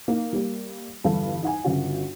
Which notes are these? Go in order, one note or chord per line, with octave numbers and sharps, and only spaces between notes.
A#3 D#4
G3 A#3
G1 E2 G2 A4 F5
D#4 F#5 G#5
G1 C#3 F#4